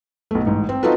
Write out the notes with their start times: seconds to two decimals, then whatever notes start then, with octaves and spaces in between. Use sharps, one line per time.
0.31 B1 A3
0.46 A1 G#2
0.69 C4
0.83 C4 D#4 F4 F#4 A4 B4